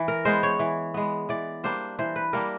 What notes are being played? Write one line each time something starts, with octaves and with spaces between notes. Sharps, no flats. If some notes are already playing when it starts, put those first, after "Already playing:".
Already playing: E3
A#4
G#3 B3 C5
C#5
E3
G#3 B3
E3 D5
G3 A#3 D4 C5
E3 C5
B4
G3 A#3 D4 A#4